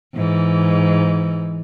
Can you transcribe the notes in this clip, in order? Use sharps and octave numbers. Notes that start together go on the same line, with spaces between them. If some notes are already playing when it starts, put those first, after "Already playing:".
G#2 E3